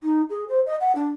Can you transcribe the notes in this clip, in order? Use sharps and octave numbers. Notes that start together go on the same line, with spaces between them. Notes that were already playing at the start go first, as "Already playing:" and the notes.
D#4
G#4
C5
D#5
F#5
D4